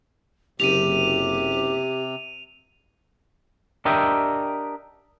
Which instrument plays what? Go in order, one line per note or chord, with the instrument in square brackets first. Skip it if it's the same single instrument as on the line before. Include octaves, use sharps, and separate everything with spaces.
[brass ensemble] F#1 [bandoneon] C3 [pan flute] G4 [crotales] D#7 F7
[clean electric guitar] D4 G4 A#4 D#5 E5 G5